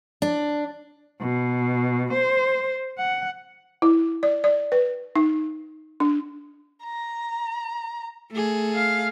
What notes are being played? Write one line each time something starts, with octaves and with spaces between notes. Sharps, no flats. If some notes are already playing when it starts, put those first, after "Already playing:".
D4
B2
C5
F#5
E4
D5
D5
B4
D#4
D4
A#5
A3 G#4
F5